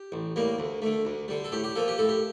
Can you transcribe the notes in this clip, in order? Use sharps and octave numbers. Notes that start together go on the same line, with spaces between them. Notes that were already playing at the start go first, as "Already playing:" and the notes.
Already playing: G4
A1
A2 G3 A#3
D2
D3 A3
D2
D3 G3
A4
A2 G4
G4
F3 A#3 A4
G4
A2 A4
G4